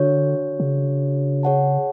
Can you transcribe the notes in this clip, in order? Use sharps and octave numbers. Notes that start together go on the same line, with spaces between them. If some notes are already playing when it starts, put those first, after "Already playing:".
Already playing: D3 D4 F#4 C#5
C#3
G#4 C#5 F#5 A5